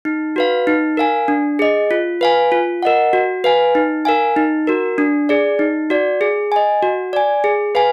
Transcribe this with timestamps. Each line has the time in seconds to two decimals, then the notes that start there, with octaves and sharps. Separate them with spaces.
0.05 D#4
0.36 F#4 B4 F5
0.67 D#4
0.97 A#4 F5 G#5
1.28 D4
1.59 G#4 D#5
1.91 F4
2.21 B4 F5 G#5
2.52 F4
2.83 A#4 D#5 F#5
3.13 F#4
3.44 B4 F5 G#5
3.75 D#4
4.05 A#4 F5 G#5
4.36 D#4
4.67 F#4 A#4
4.98 D4
5.29 G#4 D5
5.59 D#4
5.90 F#4 D5
6.21 G#4
6.52 D#5 G#5
6.83 F#4
7.13 D5 G#5
7.44 G#4
7.75 B4 F5 G#5